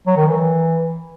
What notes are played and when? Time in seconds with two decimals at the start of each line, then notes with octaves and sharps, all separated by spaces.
0.07 F#3
0.17 D#3
0.27 E3